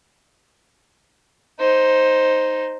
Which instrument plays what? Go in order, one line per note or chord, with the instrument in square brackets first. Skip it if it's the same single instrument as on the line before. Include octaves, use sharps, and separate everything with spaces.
[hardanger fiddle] D#4 C5